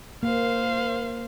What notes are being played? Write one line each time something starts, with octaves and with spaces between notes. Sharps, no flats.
A#3 C5 F5